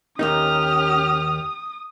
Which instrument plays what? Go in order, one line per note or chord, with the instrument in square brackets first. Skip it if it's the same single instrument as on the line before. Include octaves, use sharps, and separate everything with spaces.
[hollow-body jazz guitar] D#2 A#3 D#4 [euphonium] C#4 [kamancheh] G4 F6 [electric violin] D#6